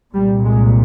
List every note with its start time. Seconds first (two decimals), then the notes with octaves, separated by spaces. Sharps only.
0.14 C2 A#2 G3
0.45 G#3